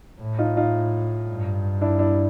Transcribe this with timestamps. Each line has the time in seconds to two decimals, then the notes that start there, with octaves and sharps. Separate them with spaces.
0.21 A2
0.39 D#4 F4
0.57 D#4 F4
1.28 G2
1.81 D4 E4
1.99 D4 E4